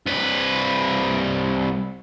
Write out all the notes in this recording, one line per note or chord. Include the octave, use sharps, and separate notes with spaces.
C2 B4